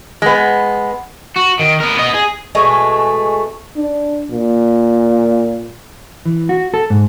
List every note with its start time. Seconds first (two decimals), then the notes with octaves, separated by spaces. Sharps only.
0.22 G#3 B3
1.36 F#4
1.59 D#3
1.80 B3 A#4
1.98 B3 D#5
2.14 G#4
2.55 B2 G#3 A3
3.77 D4
4.31 A#2
6.26 E3
6.49 F#4
6.74 A4
6.90 G#2